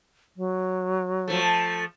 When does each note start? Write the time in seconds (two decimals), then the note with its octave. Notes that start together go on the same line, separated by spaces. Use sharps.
0.37 F#3
1.28 F3 A3